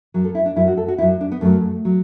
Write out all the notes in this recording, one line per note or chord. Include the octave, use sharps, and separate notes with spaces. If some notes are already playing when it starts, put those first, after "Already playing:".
F#2 F#3
A4
E4
D4
F#2 F#3 E4
F#4
A4
F#4
F#2 F#3 E4
D4
B3
F#2 F#3 A3
F#3